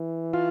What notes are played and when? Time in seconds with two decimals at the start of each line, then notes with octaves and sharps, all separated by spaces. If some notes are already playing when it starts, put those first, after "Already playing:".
Already playing: E3
0.33 F4